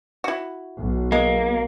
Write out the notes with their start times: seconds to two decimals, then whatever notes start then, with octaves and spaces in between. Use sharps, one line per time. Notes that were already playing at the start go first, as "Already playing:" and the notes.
0.24 E4 F#4
0.78 B1
1.12 G#3 A#3